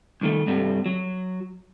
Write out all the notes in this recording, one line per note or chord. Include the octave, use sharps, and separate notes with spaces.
C2 D#3 A3
G2 C3 G3 A3
F#3